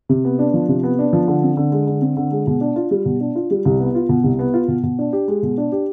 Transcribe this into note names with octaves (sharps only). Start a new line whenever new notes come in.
C3
B3
D4
F3
C3
B3
D4
F3
D3
C4
D3
G#3
D3
C4
D3
G#3
B2
D4
F4
G3
B2
D4
F4
G3
C2
B3
F4
B2
C2
B3
F4
B2
B2
D4
G4
G#3
B2
D4
G4